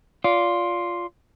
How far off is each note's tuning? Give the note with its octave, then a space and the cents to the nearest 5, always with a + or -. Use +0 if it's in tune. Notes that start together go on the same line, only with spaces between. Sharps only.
F4 +0 D5 -25